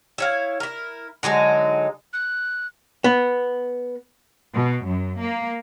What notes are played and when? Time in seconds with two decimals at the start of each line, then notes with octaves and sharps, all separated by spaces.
0.18 E4 C#5 F5
0.60 E4 A#4
1.23 D3 F#3 G#3 D#4
2.13 F#6
3.04 B3
4.54 B2
4.85 F#2
5.19 A#3